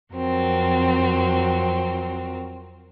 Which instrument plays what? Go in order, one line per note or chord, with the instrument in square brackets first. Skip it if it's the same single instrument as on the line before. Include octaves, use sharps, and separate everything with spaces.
[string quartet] F2 F#3 C4 A#4